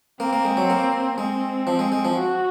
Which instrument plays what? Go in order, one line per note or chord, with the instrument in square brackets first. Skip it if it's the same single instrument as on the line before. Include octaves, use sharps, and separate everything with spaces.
[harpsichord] A#3 [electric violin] C4
[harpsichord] A#3
G#3
F#3
A#3
[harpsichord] G#3 [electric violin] C4
[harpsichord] F3
G#3
G#3
F3
[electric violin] F#4